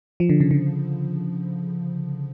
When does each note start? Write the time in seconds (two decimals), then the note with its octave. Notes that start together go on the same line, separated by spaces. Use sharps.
0.20 F3
0.29 D3
0.40 C#3
0.51 D3